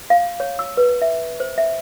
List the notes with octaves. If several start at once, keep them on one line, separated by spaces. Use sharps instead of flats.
F5
C#5
E6
B4
E5
C5
E5